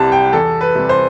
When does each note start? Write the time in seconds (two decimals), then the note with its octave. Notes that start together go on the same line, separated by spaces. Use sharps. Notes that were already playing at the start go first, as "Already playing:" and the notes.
Already playing: C2 C3 G3 A5
0.12 G5
0.33 E2 A4
0.61 B4
0.75 C3 G3
0.89 C5